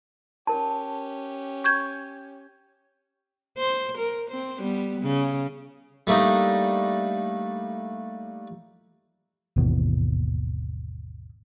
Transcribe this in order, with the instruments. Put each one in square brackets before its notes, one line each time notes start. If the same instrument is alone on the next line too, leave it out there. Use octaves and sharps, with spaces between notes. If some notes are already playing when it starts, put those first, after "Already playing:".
[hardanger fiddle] C#4 G4 [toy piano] A#4 A5
[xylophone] C#6 G6 G#6
[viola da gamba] C5
A#4
C4 C5
G3 B3
C#3
[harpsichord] G3 A3 A#3 D4 D#4
[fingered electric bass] G#1 D#2 B2 E3